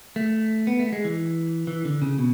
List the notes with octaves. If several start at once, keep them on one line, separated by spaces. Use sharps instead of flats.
A3
B3
A3
G#3
E3
E3
D3
C#3
B2